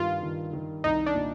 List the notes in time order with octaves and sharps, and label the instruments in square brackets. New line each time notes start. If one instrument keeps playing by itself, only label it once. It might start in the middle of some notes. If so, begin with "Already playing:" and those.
Already playing: [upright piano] G2 D#3 G3 [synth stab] F4
[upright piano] D#3
D#3
[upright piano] C2 [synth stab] D#4
[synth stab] D4
[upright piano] A#2